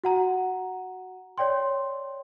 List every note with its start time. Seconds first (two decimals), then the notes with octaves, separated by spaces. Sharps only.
0.04 F#4 F#5 A#5
1.38 C#5 D5 G5 C6